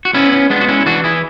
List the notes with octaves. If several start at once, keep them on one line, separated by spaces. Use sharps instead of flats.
F#4
B3 C#4 E4
C#4
G#3 B3 D4
F#4
C#4 E4
E4
E3 D4 F#4
E4 G#4